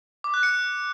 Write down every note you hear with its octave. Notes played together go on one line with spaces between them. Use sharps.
D6
F#6
C#7